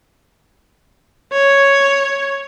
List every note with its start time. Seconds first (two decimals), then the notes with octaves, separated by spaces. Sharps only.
1.32 C#5